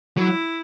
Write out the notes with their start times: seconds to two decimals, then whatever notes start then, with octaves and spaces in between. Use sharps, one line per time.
0.17 F#3 E4